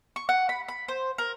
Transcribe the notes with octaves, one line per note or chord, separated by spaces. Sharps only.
C#6
F#5
B5
B5
C5
A#4